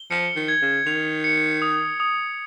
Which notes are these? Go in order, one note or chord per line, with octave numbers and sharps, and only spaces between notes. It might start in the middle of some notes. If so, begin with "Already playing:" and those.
Already playing: G7
F3 C#7
D#3
G#6
C#3
D#3 F7
C#7
D#6
D#6